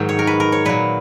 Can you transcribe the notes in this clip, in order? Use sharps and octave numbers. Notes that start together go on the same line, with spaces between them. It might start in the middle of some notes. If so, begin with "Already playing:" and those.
Already playing: G#2 D#3 F#3
C#5
A#4
B4
A#4
C#5
A#2 F#3 B4